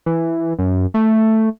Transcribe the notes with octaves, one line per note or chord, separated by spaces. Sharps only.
E3
F#2
A3